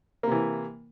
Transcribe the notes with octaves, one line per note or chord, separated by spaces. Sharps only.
C3 E3 A#3